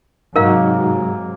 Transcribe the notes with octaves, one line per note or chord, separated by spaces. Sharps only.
G#2 C3 F#3 A#3 D#4 F#4 A#4 F5